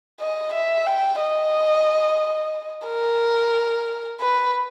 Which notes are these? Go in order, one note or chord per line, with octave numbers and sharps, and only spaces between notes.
D#5
E5
G5
D#5
A#4
B4